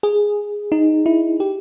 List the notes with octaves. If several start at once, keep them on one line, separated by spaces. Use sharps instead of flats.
G#4
D#4
E4
G4